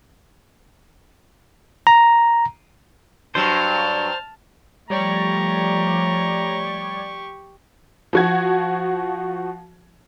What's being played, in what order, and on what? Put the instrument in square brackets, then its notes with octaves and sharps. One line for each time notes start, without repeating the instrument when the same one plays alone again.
[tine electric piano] A#5
[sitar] G2 F#3 [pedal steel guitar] C5 [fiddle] A5 F6
[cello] F3 A3 [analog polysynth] G3 C#5 D5 [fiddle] G4 C#6 [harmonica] A#5
[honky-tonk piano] F3 F#4 G#6